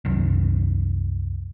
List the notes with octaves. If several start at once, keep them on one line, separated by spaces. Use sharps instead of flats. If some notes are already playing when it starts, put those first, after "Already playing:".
C2 F#2